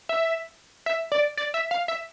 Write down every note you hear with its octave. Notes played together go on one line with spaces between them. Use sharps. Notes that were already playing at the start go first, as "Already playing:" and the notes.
E5
E5
D5
D5
E5
F5
E5